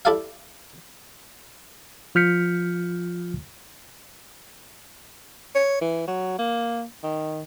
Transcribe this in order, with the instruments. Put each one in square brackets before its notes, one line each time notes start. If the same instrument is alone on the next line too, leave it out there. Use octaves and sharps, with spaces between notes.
[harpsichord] E4 G4 A4 D5 E5 F5
[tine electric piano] F3 F4 F6 G6 B6 C#7
[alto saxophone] C#5
E3
F#3
A#3
D#3